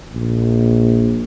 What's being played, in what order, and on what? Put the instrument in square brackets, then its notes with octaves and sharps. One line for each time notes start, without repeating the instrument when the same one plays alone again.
[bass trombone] A#1